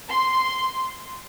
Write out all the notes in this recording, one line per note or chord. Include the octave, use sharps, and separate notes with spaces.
C6